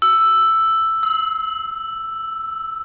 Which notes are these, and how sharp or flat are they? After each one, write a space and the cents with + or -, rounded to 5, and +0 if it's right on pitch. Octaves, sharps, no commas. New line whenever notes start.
E6 +5
E6 -30